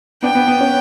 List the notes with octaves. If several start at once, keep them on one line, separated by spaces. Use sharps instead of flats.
B3 D4 G5
B3
B3
C#4